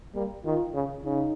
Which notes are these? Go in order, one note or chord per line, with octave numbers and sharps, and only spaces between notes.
G3 A#3
D#3 F4
C#3
C#3 D#4